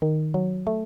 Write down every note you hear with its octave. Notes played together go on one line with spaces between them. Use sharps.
D#3
F#3
A3